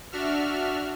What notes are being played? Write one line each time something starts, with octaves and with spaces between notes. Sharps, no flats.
D4 F#4 E5 F6